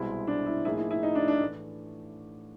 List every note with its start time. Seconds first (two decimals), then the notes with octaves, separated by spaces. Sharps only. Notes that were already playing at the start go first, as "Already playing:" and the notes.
Already playing: C2 B2 G#3 C4 E4
0.27 D4
0.46 E4
0.65 A2 F3 A#3 D#4 E4 G#4
0.78 E4
0.91 E4
1.03 D#4
1.15 D4
1.28 D4
1.40 A2 E3 A3 D4